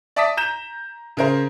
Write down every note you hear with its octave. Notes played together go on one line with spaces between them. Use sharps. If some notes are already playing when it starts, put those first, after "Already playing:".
D5 E5 A5 D6 D#6 B6
A#5 G6 E7
C#3 A#4 C5